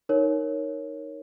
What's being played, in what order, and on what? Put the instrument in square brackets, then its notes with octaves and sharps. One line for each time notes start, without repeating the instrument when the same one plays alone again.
[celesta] D#4 A#4 C#5